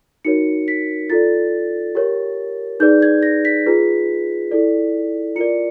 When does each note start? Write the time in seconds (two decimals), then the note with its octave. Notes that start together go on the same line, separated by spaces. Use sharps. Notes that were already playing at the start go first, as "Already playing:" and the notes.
0.25 D#4 F#4 A#4 C#5 C#7
0.68 B6
1.10 F4 A4 D5 A6
1.95 G4 A#4 C#5
2.80 D#4 G#4 B4 D5 G6
3.02 G#6
3.23 A#6
3.45 B6
3.66 F4 G#4 B4
4.51 E4 A4 D5
5.36 F4 A#4 D5 C#7